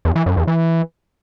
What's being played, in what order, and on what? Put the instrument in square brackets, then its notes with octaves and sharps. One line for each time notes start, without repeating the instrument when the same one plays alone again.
[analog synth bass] E2
E3
F#2
E2
E3